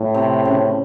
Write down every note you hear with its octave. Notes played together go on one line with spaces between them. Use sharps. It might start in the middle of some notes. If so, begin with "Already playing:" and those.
Already playing: A2
C3
C#3